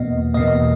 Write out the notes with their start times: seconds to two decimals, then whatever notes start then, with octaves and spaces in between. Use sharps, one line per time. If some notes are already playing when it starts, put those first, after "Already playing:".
Already playing: E2 B2 A#3 D#5
0.34 E2 B2 A#3 D#5